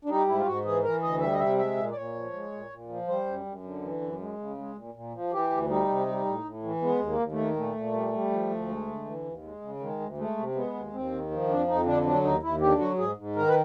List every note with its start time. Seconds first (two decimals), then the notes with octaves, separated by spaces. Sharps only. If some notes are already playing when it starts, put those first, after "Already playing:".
0.05 D4
0.09 G3 D#4
0.27 G#2 E4
0.38 F4
0.46 G#2 F#4
0.65 E3 G#4
0.83 E3 A#4
1.03 D2 D#5
1.21 G3 E5
1.33 D#5
1.39 C3 E5
1.58 G#3 E5
1.77 A#2
1.91 D5
1.96 A#2 C#5
2.14 F3
2.33 G#3
2.52 A#2
2.70 A#2
2.89 F3
3.08 G3 C5
3.26 F#2
3.45 F#2
3.64 D3
3.82 E3
4.01 F#2
4.20 G#3
4.39 C#3
4.58 G#3
4.76 A#2
4.94 A#2
5.13 F3
5.32 E3 G4
5.50 D2
5.69 G3 D#4
5.88 C3
6.07 G3
6.26 A2
6.44 A2
6.63 E3
6.82 G#3 B3
7.00 D#2
7.06 A#3
7.20 D#2
7.32 A3
7.38 D#3
7.56 A#2 A3
7.75 A#2
7.93 G3
8.13 G3
8.31 F3
8.50 D2
8.68 G#3
8.87 D3
9.06 E3
9.24 D#2
9.43 G#3
9.61 C#3
9.80 D#3 G#3
10.00 D2
10.17 G#3 A3
10.37 C3
10.55 G#3 B3
10.74 D#2
10.93 D#2 C4
11.12 D#3
11.31 F3
11.48 F2 D4
11.68 F2 D#4
11.86 D3 D4
12.05 F#3 D4
12.23 D#2 D#4
12.43 D#2 E4
12.60 D3 G4
12.79 F#3 F#4
12.98 G#2 G#4
13.17 G#2
13.36 D#3 A#4
13.48 B4